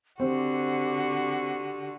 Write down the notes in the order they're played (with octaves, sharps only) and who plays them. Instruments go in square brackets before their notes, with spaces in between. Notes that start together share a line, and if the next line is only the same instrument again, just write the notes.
[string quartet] D3 F#4 [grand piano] C4 C5 [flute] G4